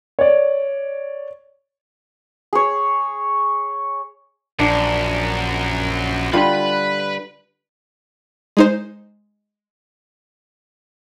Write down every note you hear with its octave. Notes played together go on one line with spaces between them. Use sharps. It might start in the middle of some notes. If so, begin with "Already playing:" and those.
C#5 D5
G#4 C#5
A#1 F#2 D4
D3 G3 F4 B4 B5
G#3 D#4 C5